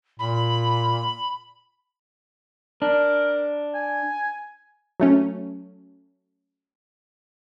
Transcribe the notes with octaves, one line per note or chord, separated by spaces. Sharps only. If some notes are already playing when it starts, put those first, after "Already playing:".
A#2 B5
D4 A#4
G#5
F#3 A3 C#4